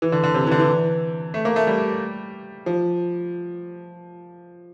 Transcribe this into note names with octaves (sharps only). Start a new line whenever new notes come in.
E3
D3
D3
C3
E3
D3
E3
A3
A#3
A3
G3
F3